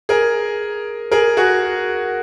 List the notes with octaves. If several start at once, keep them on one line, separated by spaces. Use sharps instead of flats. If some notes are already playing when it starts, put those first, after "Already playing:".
G#4 A#4
G#4 A#4
F#4 G#4